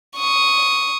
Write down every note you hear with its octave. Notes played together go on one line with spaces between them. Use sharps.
C#6 D#6